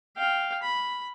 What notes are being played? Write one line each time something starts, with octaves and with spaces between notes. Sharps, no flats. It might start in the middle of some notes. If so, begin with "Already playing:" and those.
F5 G5
B5